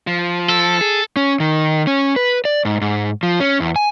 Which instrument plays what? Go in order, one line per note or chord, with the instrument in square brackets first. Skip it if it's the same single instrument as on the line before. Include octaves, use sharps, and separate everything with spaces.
[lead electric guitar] F3
[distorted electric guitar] A4
[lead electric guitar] G#4
[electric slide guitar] C#4
D#3
C#4
B4
D5
G#2
G#2
F3
C#4
E2
G#5